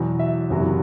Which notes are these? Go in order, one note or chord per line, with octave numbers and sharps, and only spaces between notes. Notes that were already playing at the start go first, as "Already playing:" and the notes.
Already playing: E2 B2 F#3
E5
F#1 E2 C3 F#3